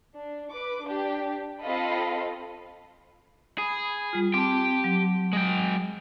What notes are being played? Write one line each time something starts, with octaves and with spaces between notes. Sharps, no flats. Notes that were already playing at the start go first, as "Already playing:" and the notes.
D4
B4 D6
D4 G4
C4 F4 A4 D#5 F5 B5
G#4 B5
G3 F4
C4 G4 G5 A5
F#3
G#3 G5